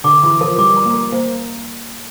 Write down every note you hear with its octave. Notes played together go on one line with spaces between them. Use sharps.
D3 D6
E3 D6
F3 A#4
G3 D6
A#5
A#3
A#4
A#3 C5